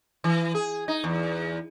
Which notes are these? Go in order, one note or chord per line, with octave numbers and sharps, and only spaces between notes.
E3
G#4
D#4
E2